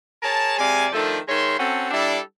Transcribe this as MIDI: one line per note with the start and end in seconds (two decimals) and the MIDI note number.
0.23 0.55 68
0.23 0.55 70
0.23 0.55 73
0.23 0.55 81
0.58 0.87 48
0.58 0.87 56
0.58 0.87 74
0.58 0.87 77
0.58 0.87 80
0.92 1.18 51
0.92 1.18 53
0.92 1.18 57
0.92 1.18 62
0.92 1.18 69
1.28 1.57 51
1.28 1.57 56
1.28 1.57 73
1.28 1.57 76
1.28 1.57 84
1.58 1.87 60
1.58 1.87 61
1.58 1.87 66
1.58 1.87 69
1.91 2.19 55
1.91 2.19 62
1.91 2.19 64
1.91 2.19 67
1.91 2.19 69
1.91 2.19 74